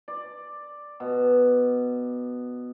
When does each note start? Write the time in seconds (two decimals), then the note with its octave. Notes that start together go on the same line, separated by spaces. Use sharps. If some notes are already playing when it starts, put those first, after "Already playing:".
0.08 D5
1.00 B2